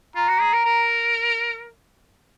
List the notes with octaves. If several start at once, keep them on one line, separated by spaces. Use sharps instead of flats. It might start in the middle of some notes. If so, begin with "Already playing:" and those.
F4 A#5
F#4
G#4
A#4
A#4